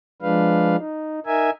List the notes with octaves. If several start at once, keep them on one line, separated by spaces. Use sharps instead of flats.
F3 G#3 D4 B4 F5
D#4
D#4 A#4 E5 G#5